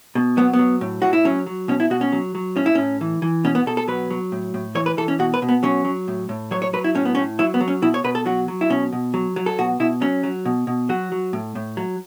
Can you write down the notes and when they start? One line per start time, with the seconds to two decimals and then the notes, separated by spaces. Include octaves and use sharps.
0.15 B2
0.37 F#3 B3
0.53 B3
0.59 F#3
0.81 A2
1.02 A2 F#4
1.13 E4
1.25 F#3 C#4
1.46 F#3
1.68 B2 C#4
1.80 E4
1.90 B2 F#4
2.01 C#4
2.12 F#3
2.35 F#3
2.56 A2 C#4
2.66 E4
2.75 A2 C#4
3.01 E3
3.22 E3
3.44 B2 C#4
3.55 B3
3.66 B2 A4
3.77 A4
3.88 F#3 B4
4.11 F#3
4.32 A2
4.54 A2
4.75 E3 C#5
4.86 B4
4.97 E3 A4
5.08 C#4
5.19 B2 F#4
5.34 B4
5.42 B2
5.49 B3
5.63 F#3 C#4
5.85 F#3
6.08 A2
6.29 A2
6.51 F#3 C#5
6.62 C#5
6.73 F#3 B4
6.84 E4
6.95 A2 C#4
7.05 B3
7.15 C#4
7.17 A2
7.39 F#3 E4
7.54 B3
7.61 F#3
7.68 C#4
7.82 B2 E4
7.94 C#5
8.04 B2 B4
8.15 A4
8.26 F#3 F#4
8.48 F#3
8.61 E4
8.70 B2 C#4
8.93 B2
9.14 F#3
9.36 F#3
9.46 A4
9.58 B2 F#4
9.80 B2 E4
10.01 F#3 C#4
10.23 F#3
10.45 B2
10.67 B2
10.89 F#3 F#4
11.12 F#3
11.33 A2
11.55 A2
11.77 F#3